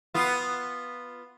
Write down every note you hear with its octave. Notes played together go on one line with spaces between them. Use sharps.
B3 F4